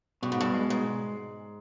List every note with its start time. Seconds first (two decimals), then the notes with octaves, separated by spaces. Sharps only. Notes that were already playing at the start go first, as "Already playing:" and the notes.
0.23 G2 B2
0.32 G#2
0.41 G2
0.54 G#3
0.70 G#2